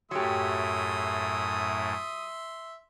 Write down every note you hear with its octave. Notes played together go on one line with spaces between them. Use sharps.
F#2 A2 F#3 G4 E5 C6 D#6